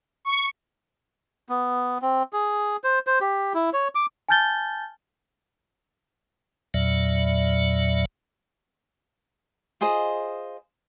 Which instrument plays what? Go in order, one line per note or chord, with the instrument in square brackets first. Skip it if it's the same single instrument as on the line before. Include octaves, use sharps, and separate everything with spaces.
[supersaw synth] C#6
[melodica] B3
C4
G#4
C5
C5
G4
E4
C#5
D6
[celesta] G#5 A5 F6 G6 A6 G7
[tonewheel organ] E2 A#2 F#3 D5 E5
[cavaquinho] F4 G#4 C5 D#5